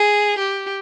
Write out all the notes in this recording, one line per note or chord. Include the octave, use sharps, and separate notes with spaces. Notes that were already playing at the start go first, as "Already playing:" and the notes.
Already playing: G#4
G4